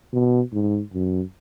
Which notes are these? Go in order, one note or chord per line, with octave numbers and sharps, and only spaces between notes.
B2
G#2
F#2